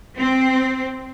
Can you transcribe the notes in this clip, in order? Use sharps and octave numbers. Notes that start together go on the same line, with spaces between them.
C4